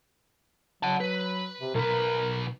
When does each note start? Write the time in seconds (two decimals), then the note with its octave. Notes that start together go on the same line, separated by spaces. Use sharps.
0.83 F#3 F#5 A5
1.00 B4
1.61 C3
1.75 B1 A#4 B4